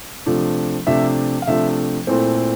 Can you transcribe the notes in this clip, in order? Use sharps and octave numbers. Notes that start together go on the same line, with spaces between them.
C3 F3 A3 D4
C3 F3 A3 D4 E5
F5
C3 F3 A3 D4 E5
A#2 A3 C4 E4 C5
A4